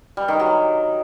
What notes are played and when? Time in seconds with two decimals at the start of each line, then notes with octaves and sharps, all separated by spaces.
0.17 G3
0.28 D#3
0.40 F#3